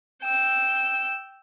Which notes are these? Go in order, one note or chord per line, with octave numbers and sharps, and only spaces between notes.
G5 E6